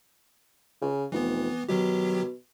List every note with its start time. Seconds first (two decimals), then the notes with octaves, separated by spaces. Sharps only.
0.81 C#3
1.12 F1 E3 B3
1.69 B2 D#3 F#3 G4